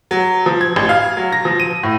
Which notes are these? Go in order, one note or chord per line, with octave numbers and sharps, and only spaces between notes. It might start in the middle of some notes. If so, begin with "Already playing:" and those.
F#3
F3
G#6
A1
F5
F#3
A#6
F3
D#7
A2